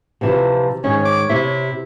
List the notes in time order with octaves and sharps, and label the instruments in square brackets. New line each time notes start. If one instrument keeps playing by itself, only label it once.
[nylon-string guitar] C3 E3 F3
[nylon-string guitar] G#2 D#3 [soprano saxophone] C#4 [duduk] C#5
[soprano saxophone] D6
[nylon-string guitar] C3 [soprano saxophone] E4